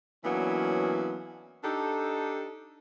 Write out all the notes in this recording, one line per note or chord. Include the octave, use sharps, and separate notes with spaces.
E3 F#3 A#3 B3 C#4 D4
D4 D#4 G4 A4